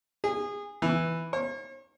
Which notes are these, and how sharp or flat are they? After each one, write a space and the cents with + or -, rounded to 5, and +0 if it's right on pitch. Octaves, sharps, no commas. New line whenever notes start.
G#4 -25
E3 +0
C#5 -45